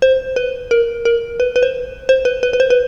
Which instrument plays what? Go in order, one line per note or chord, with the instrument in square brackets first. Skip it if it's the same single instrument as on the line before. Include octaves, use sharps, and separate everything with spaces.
[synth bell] C5
B4
A#4
A#4
B4
B4
C5
C5
B4
B4
B4
C5
B4